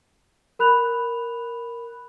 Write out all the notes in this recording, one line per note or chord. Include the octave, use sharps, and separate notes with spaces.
A#4 B5 F#6 F7